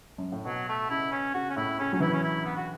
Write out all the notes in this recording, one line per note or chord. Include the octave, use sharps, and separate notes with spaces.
F#2
A2
B2 F#3
A3
C#3 E4
C#4
C#3 F#4
C#4
A2 E4
C#3 C#4
F#3 C#4
E3 E4
C#4
E4
B3
F#4